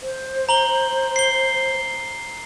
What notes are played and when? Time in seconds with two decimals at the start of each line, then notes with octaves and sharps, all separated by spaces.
0.01 C5
0.49 A#5 F#7 G7
1.16 C7 G7